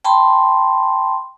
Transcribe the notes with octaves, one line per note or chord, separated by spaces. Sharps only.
G5 A5 B5 C6